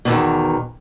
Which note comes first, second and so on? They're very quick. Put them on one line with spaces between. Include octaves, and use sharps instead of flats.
B2 E2 D#3